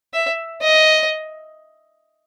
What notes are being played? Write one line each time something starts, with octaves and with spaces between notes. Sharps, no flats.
E5
D#5